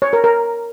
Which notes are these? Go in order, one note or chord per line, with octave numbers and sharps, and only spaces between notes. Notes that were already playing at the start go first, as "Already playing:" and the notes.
C#5
A#4
A#4